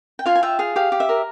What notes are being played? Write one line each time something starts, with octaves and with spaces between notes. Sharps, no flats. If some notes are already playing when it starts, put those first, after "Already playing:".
G5
F4 F5 G#5
G#5
F4 E5 G5
G#4 F5
G4 F5
G4
E5
A#4